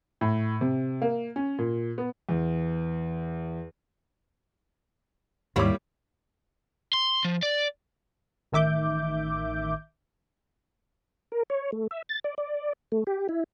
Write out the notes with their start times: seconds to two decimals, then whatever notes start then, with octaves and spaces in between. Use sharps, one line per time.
0.21 A2
0.61 C3
1.02 A#3
1.36 C#4
1.59 A#2
1.98 B3
2.29 E2
5.56 D#2 G#2 G3 A#3 E4 C#5 D6
6.93 C6
7.24 F3
7.43 D5
8.52 A1 D#3 E5 D6 G6
11.32 A#4
11.50 C#5
11.72 A3
11.91 E5
12.09 A6
12.24 D5
12.38 D5
12.92 A3
13.07 G4
13.29 E4